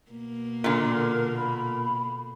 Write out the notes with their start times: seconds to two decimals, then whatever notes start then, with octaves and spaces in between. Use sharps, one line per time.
0.11 B2 A#3
0.64 A#2 D3 A#4
1.37 B5